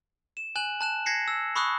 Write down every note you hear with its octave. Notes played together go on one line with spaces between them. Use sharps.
E7
G#5 F#6 E7 F#7
A5 F#6 E7
G#6 A#6 C7 C#7
E6
B5 C#6 D#6 E6 F#6